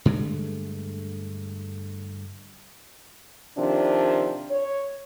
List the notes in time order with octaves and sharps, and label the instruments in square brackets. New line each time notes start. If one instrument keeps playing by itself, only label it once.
[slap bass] G2 D3 G#3 A3
[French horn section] C3 D#3 F3 D4
C#5